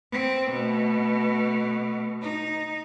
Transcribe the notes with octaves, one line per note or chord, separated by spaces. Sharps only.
C4
B2 A3
D#4